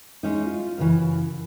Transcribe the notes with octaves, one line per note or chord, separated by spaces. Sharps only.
G#3 C#4 D#4
F4
F#2 C#3 E3